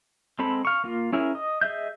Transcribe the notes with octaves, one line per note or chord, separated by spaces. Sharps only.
G#3 C4 A4 B5
F5 C#6
A#3 F4
C#4 E4 G#4 A#4
D#5
G#4 D#5 E5 G6